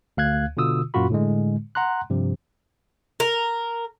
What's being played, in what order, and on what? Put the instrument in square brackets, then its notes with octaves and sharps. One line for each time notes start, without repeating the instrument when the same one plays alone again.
[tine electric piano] D2 F5 F#6 G#6
B2 D3 F4 D#6 E6
F#2 A#2 F4 F#4 B5
A2 D3 G#3
F#5 A#5 C6 F#6
G2 C3 F3
[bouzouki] A#4